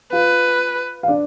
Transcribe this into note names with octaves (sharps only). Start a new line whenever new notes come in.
F4 B4 F5
F5
D4 D5